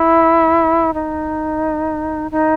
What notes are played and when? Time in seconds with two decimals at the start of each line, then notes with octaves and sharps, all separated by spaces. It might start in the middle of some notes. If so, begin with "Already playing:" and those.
Already playing: E4
0.94 D#4
2.31 D#4